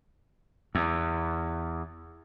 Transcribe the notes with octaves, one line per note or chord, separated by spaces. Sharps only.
E2